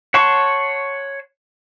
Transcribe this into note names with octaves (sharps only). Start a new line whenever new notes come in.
C#5 F#5 A5 C6 C#6